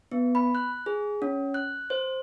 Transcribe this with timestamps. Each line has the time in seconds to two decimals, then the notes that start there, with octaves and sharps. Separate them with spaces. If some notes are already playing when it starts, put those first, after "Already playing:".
0.12 B3
0.35 B5
0.55 F#6
0.86 G#4
1.22 C#4
1.54 F#6
1.90 C5